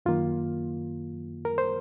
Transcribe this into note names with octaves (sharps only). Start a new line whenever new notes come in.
F#2 D#3 A#3 F4
A#4
C5